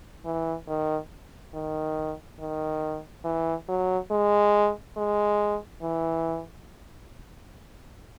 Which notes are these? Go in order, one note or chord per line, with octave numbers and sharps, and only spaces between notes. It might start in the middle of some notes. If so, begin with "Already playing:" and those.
E3
D#3
D#3
D#3
E3
F#3
G#3
G#3
E3